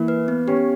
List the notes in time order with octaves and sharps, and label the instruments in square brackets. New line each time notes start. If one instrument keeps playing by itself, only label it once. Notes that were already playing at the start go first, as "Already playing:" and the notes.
Already playing: [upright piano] E3 [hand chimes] A#3
[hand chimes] B4
B3
[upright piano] C#4 [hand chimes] G4